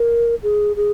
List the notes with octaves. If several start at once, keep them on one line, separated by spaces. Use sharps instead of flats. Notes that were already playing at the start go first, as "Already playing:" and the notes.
Already playing: A#4
G#4
G#4